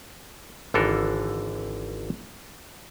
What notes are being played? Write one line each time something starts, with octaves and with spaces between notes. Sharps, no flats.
G#1 D3 E3 F4 A4 A#4